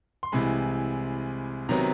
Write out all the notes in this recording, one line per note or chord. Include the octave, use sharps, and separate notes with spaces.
C6
C2 C3 E3 G#3 B5
C3 D#3 F#3 B3 A#5